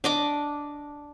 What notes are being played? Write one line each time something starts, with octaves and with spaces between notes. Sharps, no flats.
D4 D#5 D6